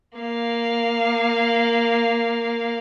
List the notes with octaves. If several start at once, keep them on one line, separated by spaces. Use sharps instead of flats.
A#3 F5